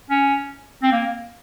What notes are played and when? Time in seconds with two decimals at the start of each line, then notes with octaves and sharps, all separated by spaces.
0.10 C#4
0.83 C4
0.92 A#3